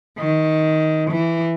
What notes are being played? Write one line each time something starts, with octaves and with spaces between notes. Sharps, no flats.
D#3
E3